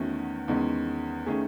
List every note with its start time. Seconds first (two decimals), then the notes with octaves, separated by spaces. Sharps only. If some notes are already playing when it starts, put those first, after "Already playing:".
Already playing: E2 D#3 A3 C#4 F#4
0.48 E2 D#3 G#3 C#4
1.26 D#3 A3 C#4 G#4